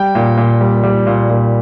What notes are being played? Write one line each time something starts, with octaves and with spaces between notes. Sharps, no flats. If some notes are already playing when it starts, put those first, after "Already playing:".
Already playing: G3 G5
A#2
A#2
G3
G3
A#2
A#2